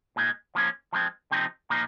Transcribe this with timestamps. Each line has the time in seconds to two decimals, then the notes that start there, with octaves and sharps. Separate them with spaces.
0.16 A#2 G#3 D#4
0.55 F3 A#3 C#4
0.93 F3 G#3 C4
1.31 C3 F3 C4 D#4
1.70 A#2 F3 A#3 D#4